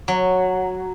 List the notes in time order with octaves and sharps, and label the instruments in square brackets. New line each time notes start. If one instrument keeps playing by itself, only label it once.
[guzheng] F#3